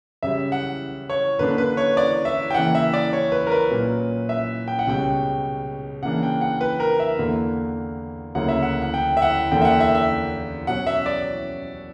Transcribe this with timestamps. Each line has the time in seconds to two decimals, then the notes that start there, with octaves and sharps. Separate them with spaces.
0.23 F#2 C#3 G3 E5
0.52 F#5
1.10 C#5
1.39 F#2 D3 A#3 D4 B4
1.58 B4
1.77 C#5
1.97 D5
2.25 E5
2.51 G5
2.54 C#3 E3 A#3 F#5
2.75 E5
2.94 D5
3.13 C#5
3.32 B4
3.47 A#4
3.52 B4
3.71 A#2 F#3 C#4
4.29 E5
4.68 G5
4.79 F#5
4.87 C#2 B2 G3 C#4 G5
6.03 C#3 E3 A#3 D4 F#5
6.23 G5
6.41 F#5
6.61 B4
6.80 A#4
7.00 E5
7.19 E2 D3 A#3 E4
8.35 D2 C#3 F#3 A#3 E4 F#5
8.48 E5
8.63 F#5
8.82 F#5
8.94 G5
9.17 E5
9.22 F#5
9.51 E2 D3 A#3 G5
9.61 E5
9.65 F#5
9.80 E5
9.95 E5
10.67 B2 F#3 C#4 F#5
10.87 E5
11.06 D5